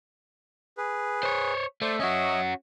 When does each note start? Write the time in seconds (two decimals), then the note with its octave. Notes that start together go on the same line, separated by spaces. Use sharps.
0.78 G#4 B4
1.23 C5 C#5
1.82 A3 C5 D5
1.99 C#4 F#4 C#5 D#5 E5